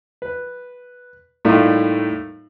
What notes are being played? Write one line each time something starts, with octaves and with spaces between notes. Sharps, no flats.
B4
A2 G3 A3 A#3 D#4 F4